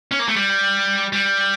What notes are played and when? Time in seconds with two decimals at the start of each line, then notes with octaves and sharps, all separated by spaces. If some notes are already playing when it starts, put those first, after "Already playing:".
0.12 C#4
0.19 A#3
0.28 A3
0.36 G3
1.13 G3